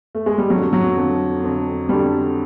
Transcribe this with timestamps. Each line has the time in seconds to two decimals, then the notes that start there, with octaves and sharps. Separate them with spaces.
0.15 A3
0.26 G#3
0.38 G3
0.50 F2 D3 F#3
0.73 F#3
0.96 F2 D3
1.42 F2 D3
1.89 F2 D3 G3